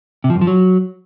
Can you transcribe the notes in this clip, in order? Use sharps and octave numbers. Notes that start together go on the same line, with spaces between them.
C3
F3
F#2
F3
F#3